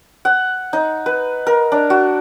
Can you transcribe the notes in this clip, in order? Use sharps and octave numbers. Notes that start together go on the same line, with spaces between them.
F#5
D#4
B4
A#4
D4
F#4